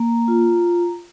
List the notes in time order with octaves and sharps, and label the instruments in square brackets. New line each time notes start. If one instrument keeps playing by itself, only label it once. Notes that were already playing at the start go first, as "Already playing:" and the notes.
Already playing: [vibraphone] A#3 A#5
F4